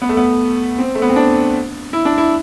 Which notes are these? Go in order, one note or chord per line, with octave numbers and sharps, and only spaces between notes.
B3
A3
B3
C4
A3
B3
C4
D4
E4
D4
E4